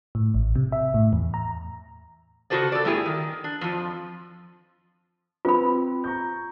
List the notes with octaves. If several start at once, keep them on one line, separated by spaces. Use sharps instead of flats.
A2
A1
C3
E5
A2
E2
A#5
C#3 F#3 F#4 A4 C5 D5
A4 D5
G2 A3 B3 E4 G4 G#4
D#3
D4
F2 F3
C4 F4 B4 B5
A#5 C#6 G6